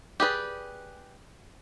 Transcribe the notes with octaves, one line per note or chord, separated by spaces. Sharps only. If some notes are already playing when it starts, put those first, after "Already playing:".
G4 G#4 B4 D5